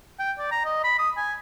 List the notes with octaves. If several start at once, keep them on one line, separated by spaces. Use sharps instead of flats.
G5
D5
A#5
D#5
B5
D#6
G#5